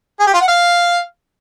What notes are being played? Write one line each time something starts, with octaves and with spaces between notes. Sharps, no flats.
G#4
G4
F4
F#5
F5